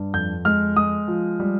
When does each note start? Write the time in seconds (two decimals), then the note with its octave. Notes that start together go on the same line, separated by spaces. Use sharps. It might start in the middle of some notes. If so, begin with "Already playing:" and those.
Already playing: G2
0.14 F2 G6
0.45 G#3 F6
0.76 G#3 D#6
1.08 F3
1.40 G3